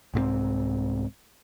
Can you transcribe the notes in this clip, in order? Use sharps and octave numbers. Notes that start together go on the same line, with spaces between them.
C2 G#2 F#3 C4